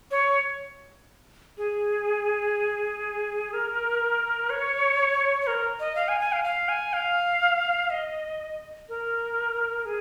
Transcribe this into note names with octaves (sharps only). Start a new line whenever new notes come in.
C#5
G#4
A#4
C#5
C#5
A#4
D#5
F5
G#5
G#5
F5
F5
G#5
F5
D#5
A#4
G#4